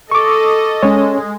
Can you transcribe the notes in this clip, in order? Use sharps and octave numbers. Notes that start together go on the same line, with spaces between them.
A4 D#5 C#6 D6
G#3 C#4 C#5